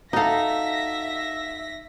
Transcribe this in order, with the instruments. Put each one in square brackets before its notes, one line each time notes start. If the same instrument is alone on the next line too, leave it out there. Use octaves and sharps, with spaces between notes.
[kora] D#4 A4 [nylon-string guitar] F#4 F5 [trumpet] E5 [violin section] A#6 B6